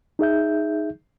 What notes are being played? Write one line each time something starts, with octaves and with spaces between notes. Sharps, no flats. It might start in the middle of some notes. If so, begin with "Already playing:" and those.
D#4 G#4 E5 G6